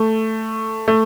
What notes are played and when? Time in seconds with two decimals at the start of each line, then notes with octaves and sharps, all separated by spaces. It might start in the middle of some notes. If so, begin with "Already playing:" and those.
Already playing: A3
0.88 A3